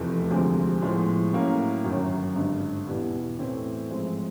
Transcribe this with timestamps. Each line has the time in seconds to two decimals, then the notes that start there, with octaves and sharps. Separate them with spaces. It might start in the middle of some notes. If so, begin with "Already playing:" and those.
Already playing: F1 E2 C3 F3 A3
0.30 D2 C3 F3 G#3
0.82 A2 F3 G#3 B3
1.33 A2 F#3 A#3 C#4
1.84 G1 F#2 D#3 F#3
2.36 G#1 G2 D3
2.87 E2 B2 G3 B3 E4
3.38 A2 E3 A3 C4 E4
3.90 A1 G#2 F3 G#3 C4